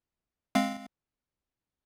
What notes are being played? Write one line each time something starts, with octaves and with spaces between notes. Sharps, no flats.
G#3 C4 F5